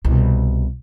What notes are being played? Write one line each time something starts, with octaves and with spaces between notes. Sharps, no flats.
C2 B2